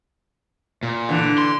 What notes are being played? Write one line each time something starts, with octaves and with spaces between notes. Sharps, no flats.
A#2
D3 E3
C6